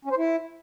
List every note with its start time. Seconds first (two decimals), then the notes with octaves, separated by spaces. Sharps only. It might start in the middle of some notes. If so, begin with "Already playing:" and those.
0.05 C#4
0.11 C5
0.18 E4